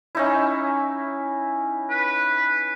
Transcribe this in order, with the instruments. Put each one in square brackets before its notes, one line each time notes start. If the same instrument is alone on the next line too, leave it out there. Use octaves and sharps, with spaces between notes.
[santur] C#4 D#4 E4
[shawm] B4